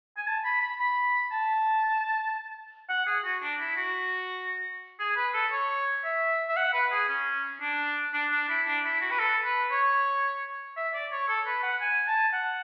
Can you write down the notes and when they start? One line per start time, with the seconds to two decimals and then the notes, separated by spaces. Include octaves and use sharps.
0.17 G#5
0.27 A5
0.44 B5
0.61 B5
0.79 B5
1.32 A5
2.89 F#5
3.06 G#4
3.24 F#4
3.42 D4
3.59 E4
3.76 F#4
4.99 G#4
5.16 B4
5.34 A4
5.52 C#5
6.04 E5
6.49 E5
6.56 F#5
6.73 B4
6.92 G#4
7.08 C#4
7.61 D4
8.13 D4
8.32 D4
8.49 E4
8.66 D4
8.84 E4
9.01 F#4
9.11 B4
9.19 A4
9.45 B4
9.71 C#5
10.76 E5
10.94 D5
11.12 C#5
11.28 A4
11.46 B4
11.63 F#5
11.81 G#5
12.08 A5
12.33 F#5